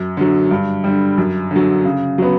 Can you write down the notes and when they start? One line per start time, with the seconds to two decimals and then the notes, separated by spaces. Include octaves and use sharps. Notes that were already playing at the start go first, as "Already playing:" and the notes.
Already playing: F#2
0.17 D3 F#3
0.51 G2
0.84 D3 G3
1.18 F#2
1.51 D3 F#3
1.85 C#3
2.18 F#3 B3